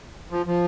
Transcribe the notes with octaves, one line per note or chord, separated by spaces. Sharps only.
F3
F3